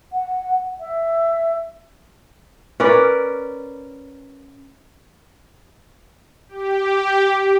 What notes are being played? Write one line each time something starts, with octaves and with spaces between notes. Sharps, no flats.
F#5
E5
C#4 A#4 B4 D5
G4